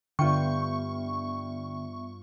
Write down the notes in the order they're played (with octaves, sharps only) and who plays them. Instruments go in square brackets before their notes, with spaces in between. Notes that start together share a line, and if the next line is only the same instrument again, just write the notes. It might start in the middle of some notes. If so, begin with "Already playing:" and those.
[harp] G2 F4 G5 [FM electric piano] D3 [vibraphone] B3 E5 [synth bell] C#6